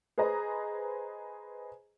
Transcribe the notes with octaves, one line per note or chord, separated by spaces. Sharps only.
G#4 B4 C5 D#5 A#5